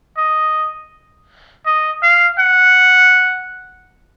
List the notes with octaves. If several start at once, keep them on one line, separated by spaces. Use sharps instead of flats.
D#5
D#5
F5
F#5